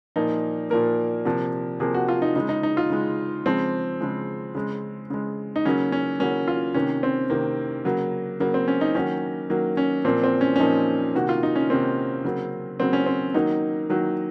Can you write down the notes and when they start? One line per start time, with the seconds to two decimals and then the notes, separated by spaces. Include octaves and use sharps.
0.16 A#2 F3 A#3 D#4
0.70 A#2 F3 A#3 A#4
1.25 C3 F3 A#3
1.80 C3 F3 A#3 G#4
1.94 F#4
2.09 F4
2.22 D#4
2.36 C#3 G#3 D#4
2.49 D#4
2.63 D#4
2.77 F4
2.90 C#3 G#3
3.46 C#3 F3 G#3 C4
4.01 C#3 F3 G#3
4.55 C#3 G#3
5.10 C#3 G#3
5.56 D#4
5.65 C#3 F#3 A#3 C#4
5.92 C#4
6.20 C#3 F#3 A#3 C#4
6.48 F4
6.74 C3 D#3 A#3 C#4
7.03 C4
7.30 C3 D#3 A#3
7.85 C#3 F#3 A#3
8.40 C#3 F#3 A#3
8.54 C4
8.68 C#4
8.81 D#4
8.95 D#3 F#3 A#3 C#4
9.50 D#3 F#3 A#3
9.77 C#4
10.05 A#2 F3 A#3 C4
10.24 C4
10.41 C#4
10.56 C#4
10.59 A#2 F3 A#3 D#4
11.15 C3 D#3 A#3 F#4
11.29 F4
11.43 D#4
11.55 C#4
11.70 C3 D#3 A#3 C4
12.24 C#3 F#3 A#3
12.79 C#3 F#3 A#3 C4
12.93 C#4
13.06 C4
13.34 D#3 F#3 A#3 D#4
13.90 D#3 F#3 A#3